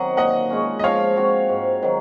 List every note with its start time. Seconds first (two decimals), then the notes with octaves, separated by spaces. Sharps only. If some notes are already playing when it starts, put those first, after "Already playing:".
Already playing: D#3 F#3 C4 D#5 F#5
0.17 A#2 D#5 F#5
0.50 G#3 C#4
0.79 D#5
0.83 F3 C#5 F5
1.16 C4 F#4
1.49 G#2
1.83 D#3 F#3